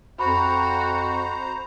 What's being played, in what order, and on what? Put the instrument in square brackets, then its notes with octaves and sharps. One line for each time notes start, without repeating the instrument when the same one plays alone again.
[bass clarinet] F2 [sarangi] F#4 [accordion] C5 A#5 [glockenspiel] B5